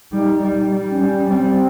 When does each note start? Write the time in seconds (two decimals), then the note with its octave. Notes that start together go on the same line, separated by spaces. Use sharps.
0.12 G3 D#4
0.41 G3
0.51 D#4
0.71 G3
0.91 C#4
1.00 G3
1.10 C#4
1.29 G3 C4